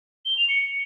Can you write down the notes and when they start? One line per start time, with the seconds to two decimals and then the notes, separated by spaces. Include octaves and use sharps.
0.25 G7
0.37 F7
0.49 C#7